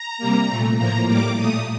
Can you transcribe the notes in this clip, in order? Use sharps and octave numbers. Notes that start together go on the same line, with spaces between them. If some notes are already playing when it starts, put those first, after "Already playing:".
Already playing: A#5
C3 G3 A#3
A#2 A3
A2 F3 A#3 A#5
A2 G3 A#3 D6
A#2 A3 D#6